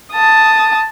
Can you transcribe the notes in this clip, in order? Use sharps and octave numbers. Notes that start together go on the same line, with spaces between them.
A5 D#6